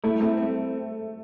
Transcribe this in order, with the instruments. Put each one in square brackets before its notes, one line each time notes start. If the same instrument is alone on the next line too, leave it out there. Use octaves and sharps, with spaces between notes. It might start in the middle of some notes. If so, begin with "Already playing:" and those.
[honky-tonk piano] A3 [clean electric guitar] E4
[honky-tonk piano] A3 [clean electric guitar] C4
[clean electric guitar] C4